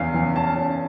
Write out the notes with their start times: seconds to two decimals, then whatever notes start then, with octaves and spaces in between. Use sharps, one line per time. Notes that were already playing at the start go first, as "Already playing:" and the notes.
Already playing: E2 E3 C#4 F5
0.14 E3
0.36 C#4 A5
0.57 C#4